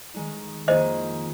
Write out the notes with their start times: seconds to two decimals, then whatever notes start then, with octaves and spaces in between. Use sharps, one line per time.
0.14 D#3 G#3 D#4
0.68 F2 D#3 A#3 D#4 G#4 C5 D#5